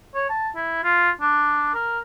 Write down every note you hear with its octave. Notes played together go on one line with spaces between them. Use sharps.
C#5
A5
E4
F4
D4
A#4